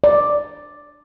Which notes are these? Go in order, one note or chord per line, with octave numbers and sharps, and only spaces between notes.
D5